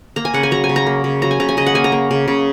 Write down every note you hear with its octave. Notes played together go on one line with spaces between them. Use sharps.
A#3 A#5
G#5
C#3 F#5
G#5
F#3 A#5
G#5
C#3
A#5
A#3
C#3
F#3 A#5
G#5
C#3 A#5
G#5
C#3 D#5
F#5
A#3 G#5
A#5
A#3
C#3
C#3